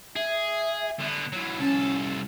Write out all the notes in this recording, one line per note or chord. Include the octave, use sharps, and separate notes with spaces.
G#4 E5
D3 B3
E3 F#3
C2 C#4 A4